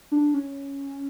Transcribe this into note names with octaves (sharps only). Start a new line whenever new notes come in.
D4
C#4